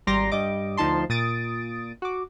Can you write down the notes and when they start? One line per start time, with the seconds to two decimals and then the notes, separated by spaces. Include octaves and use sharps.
0.07 G#1 G3 A#5 C6 D6 A#6
0.32 G2 G3 D#5 D6
0.77 D2 F3 D#4 A5 C6
1.10 A#2 D#6 A6 D7
2.02 F#4 D6